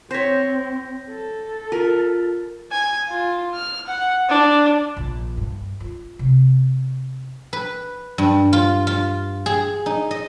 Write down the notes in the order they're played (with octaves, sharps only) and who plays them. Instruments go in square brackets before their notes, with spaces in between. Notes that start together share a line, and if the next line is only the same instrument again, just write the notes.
[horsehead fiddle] C4 [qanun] C5 C#5 [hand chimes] G6 A#6 B6
[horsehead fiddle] A4
[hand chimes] F4 [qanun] A#4
[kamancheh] G#5
F4
F6
F#5
D4
[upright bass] A#1 D#3
G2
F4
C3
[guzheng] B4
G2
F4
F4
G#4
D#4
D#5